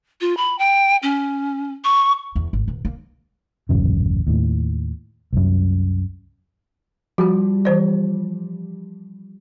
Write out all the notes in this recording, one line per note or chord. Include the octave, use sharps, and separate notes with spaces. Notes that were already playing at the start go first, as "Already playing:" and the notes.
F4
B5
G5
C#4
C#6
E2
G#1
D#1
A#3
D#1 A1 F#2 C#3
D#2 A2
C2 F#2
F3 G3 F#4 G4
E3 C5 D5